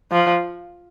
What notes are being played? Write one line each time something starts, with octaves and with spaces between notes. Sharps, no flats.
F3